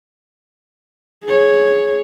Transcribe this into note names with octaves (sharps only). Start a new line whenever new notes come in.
G#4 C#5